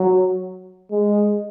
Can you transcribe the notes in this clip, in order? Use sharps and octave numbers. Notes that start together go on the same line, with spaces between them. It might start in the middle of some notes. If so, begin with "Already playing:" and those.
Already playing: F#3
G#3